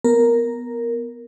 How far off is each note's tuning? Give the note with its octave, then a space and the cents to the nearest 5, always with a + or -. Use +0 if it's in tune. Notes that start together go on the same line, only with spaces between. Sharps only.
B3 +0 A#4 +0